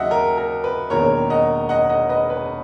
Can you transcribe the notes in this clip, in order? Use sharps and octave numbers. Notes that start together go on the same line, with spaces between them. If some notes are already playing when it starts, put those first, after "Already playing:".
Already playing: D#2 C#3 F#3 D#5 E5 F#5
A#4
A#4
B4
E1 E2 D#3 A#3 A#4 C#5
D#5 F#5
D#5 F#5
D#5 F#5
B4 D#5
B4